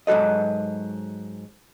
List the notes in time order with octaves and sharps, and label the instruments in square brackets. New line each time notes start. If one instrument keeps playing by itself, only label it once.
[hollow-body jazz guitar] G#2 F#3 F#4 A4 D#5